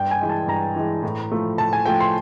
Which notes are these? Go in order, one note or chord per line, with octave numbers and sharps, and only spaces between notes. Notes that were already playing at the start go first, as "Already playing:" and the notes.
Already playing: G2 G5
G#5
E3 G#3
A5
G2 A#5
E3 G#3
A2
F3 A3
A2 A5
G#5
F3 A3 G5
C6